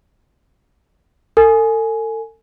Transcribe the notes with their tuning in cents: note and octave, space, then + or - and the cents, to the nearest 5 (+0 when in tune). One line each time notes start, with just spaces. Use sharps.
A4 +35 G#5 +15